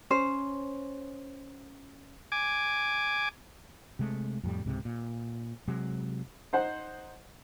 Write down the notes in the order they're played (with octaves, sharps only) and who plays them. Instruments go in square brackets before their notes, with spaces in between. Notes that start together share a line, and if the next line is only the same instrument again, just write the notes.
[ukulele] C#4 C5
[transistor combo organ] G#5 D6
[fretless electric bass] C3 G#3 A3
F2 A2 G3
C#2 G#2 C3
A#2
C3 F#3 G#3
[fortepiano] D#4 C5 F#5